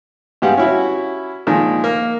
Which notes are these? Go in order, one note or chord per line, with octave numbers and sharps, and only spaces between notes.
G2 G#3 B3 G4 F5 F#5
C#4 E4 F#4
A#2 D#3 F3 G#3
A#3